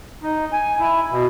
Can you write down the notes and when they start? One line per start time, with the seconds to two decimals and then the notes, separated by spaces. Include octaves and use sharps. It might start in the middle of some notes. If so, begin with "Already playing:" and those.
0.23 D#4
0.53 G#5
0.79 E4
1.11 B2